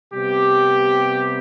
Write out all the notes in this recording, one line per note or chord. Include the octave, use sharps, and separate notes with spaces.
C3 G3 B3 G4